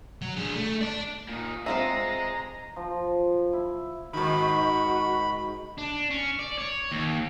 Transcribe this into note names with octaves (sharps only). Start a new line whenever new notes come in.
F#3
D4 G#4
A3
D5 A5
A#2 D#4
C4 F4 G#4 D#5 E5 A#5
F3
E4
G#2 D#3 F#4 B5
D4
C#4
D5
C#5
D#2